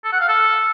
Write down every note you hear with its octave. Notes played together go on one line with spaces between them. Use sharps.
A4
F#5
F5
A4